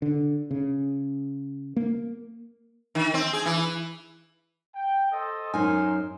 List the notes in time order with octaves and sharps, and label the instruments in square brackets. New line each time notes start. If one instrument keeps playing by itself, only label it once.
[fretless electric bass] D3
C#3
A#3
[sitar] D#3
C4
G#4
E3
[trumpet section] G5
A4 C5 D#5
[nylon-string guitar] F#2 D#4 G#5 [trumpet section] A#4 C5